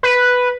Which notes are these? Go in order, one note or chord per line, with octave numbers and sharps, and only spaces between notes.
B4